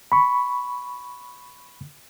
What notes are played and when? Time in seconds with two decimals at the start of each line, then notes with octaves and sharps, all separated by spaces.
0.12 B5 C#6